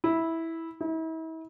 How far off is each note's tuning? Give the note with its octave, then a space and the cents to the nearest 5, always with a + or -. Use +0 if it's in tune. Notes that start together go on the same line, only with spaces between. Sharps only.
E4 -10
E4 -40